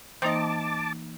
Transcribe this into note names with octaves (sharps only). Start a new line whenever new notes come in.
E3 A#3 C4 D#4 D#5 A5 D6